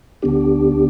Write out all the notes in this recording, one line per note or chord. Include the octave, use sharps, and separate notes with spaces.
D2 D3 B3 D4 G4